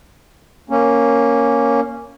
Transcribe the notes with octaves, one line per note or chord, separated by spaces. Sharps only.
A#3 C#4